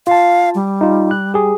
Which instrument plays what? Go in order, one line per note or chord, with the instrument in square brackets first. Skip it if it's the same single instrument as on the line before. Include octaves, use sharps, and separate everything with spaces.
[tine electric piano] F4 A5 [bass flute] F5
[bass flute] G3
[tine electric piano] D#4 F4
F#6
G4 G#4